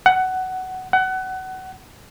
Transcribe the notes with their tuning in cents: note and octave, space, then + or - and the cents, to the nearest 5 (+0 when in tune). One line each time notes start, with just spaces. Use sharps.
F#5 +15
F#5 +25